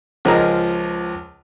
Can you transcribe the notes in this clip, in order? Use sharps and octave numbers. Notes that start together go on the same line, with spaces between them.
C#2 F3 G#4 A#4 D#5 A#5